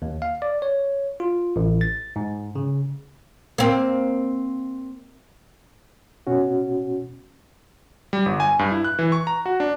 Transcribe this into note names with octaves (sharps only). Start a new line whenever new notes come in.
D#2
F5
D5
C#5
F4
A1
A6
G#2
C#3
A#3 C4
B2 C#4 F#4
G3
G1
G#5
G2
E4
F#6
E3
C#6
A#5
F#4
D4